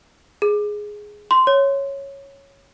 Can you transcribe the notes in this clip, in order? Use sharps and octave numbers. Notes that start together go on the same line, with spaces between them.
G#4
C6
C#5